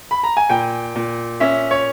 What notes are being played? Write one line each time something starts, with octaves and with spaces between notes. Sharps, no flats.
B5
A#5
G#5
A#2 G5
A#2
C#4 E5
C#5